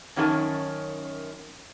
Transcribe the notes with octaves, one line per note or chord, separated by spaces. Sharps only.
F#2 D#3 C#4 F#4 A#4 A5